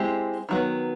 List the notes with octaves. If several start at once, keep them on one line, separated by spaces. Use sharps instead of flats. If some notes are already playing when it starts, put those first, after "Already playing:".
Already playing: G#3 C4 E4 G4
D#3 F#3 B3